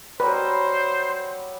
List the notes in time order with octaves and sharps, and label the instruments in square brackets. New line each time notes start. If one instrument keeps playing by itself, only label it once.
[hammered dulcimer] F#3 G3 [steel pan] B4 [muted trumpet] C5